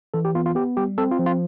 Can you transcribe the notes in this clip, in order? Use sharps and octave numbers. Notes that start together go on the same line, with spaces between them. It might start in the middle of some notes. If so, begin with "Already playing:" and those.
E3 A4
G4
B3 F4
F4
B3 G4
G3 G4
C4 A4
F4
F3
F4